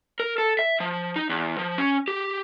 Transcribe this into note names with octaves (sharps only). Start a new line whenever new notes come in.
A#4
A4
E5
F3
D#4
E2
F3
C#4
G4